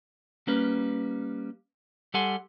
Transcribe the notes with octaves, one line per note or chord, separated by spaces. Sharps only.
G3 A#3 C#4 B4
G3 A4 F#5 G#5 C6